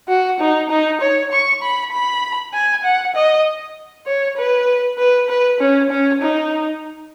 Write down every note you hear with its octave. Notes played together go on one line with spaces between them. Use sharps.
F#4
D#4
D#4
C#5
C#6
B5
B5
G#5
F#5
D#5
C#5
B4
B4
B4
C#4
C#4
D#4